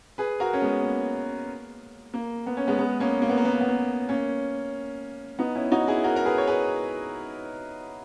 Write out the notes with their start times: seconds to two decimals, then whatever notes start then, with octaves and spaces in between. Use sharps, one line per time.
0.18 G#4 B4
0.40 F#4 A#4
0.53 C#4
0.62 G#3 B3
0.83 A#3
2.14 A#3
2.46 B3
2.57 C#4
2.67 G#3 B3
2.79 G#3 B3
3.00 A#3 C#4
3.22 A#3
3.29 B3
3.38 A#3
3.45 B3
3.53 A#3
3.61 B3
3.69 A#3
4.09 A#3 C#4
5.39 B3 D#4
5.55 C#4 E4
5.71 D#4 F#4
5.88 E4 G#4
6.04 F#4 A#4
6.16 A#4
6.25 G#4 B4
6.38 C#5
6.47 G#4 B4